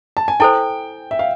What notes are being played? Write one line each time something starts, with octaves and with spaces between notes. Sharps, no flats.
A5
G#5
E4 A4 C5 G5
E5
F5